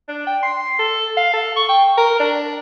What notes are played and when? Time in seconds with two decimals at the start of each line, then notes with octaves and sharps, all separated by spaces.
0.08 D4
0.27 G5
0.43 C6
0.79 A4
1.17 F5
1.33 A4
1.56 C#6
1.69 G5
1.97 A#4
2.20 D4